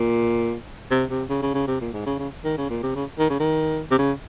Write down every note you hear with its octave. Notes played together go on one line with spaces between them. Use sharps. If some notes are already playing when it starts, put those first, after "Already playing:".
Already playing: A#2
C3
C3
C#3
C#3
C#3
C3
A#2
G#2
C#3
C#3
D#3
C#3
A#2
C3
C#3
D#3
C#3
D#3
C3
C#3